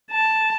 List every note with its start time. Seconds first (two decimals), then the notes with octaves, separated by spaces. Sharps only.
0.12 A5